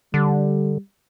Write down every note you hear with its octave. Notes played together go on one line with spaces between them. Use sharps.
D3 G3